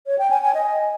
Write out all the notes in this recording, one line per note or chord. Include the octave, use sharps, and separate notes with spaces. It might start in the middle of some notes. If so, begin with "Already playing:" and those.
C#5
G5
G#5
G#5
D#5